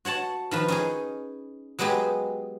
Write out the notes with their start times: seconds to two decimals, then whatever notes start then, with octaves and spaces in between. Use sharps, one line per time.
0.05 F#4 C#5 F#5 A5
0.51 D#3 F3 B4
0.68 C#4 D#4 G#4
1.79 F#3 G#3 B3 G4 G#4